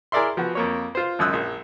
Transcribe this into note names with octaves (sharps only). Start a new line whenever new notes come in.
E4 G#4 A#4 D5 E5 C6
F3 B3 F#4
F2 A#3 C#5
F4 C5
G#1 F#2 D#6 E6 F#6
A#1